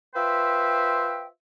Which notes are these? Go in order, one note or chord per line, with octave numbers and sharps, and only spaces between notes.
F4 B4 C5 E5 G5